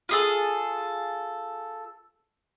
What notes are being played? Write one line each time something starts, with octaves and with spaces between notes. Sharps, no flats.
F4 G#4 A4